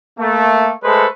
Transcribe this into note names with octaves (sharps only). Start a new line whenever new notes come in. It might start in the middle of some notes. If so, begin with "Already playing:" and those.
A3 A#3
G#3 A3 A4 B4 C5